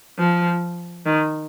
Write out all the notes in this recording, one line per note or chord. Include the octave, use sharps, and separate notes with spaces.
F3
D#3